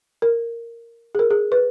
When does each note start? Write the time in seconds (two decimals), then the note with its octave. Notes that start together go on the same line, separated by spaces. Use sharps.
0.22 A#4
1.15 G#4
1.19 A#4
1.31 G#4
1.52 B4